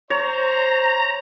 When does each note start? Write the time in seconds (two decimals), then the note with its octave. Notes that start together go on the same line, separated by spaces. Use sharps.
0.10 C5 C#5 A#5